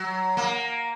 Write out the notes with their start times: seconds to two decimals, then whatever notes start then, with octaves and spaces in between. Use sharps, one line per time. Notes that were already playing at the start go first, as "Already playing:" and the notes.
Already playing: F#3
0.37 A#3